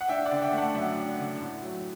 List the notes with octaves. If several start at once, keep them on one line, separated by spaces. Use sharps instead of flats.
F#5
D4 E5 G5
D5 F#5
D3
E5 G5
A3
F#5 A5
F#2 E5 G5
D4
D3
A2
F#3